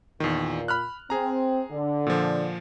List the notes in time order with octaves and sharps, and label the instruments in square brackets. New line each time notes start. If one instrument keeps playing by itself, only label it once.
[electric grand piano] E2 D#3 [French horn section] A#2
[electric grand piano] B5 F6 F#6
[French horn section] C4 [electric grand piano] G#4 A#5
[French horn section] D3
[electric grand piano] A#2 F3